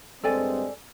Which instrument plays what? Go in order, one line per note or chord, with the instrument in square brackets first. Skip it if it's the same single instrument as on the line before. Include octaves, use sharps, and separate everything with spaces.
[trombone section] G2 G#3 C4 [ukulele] A4 D5 G#5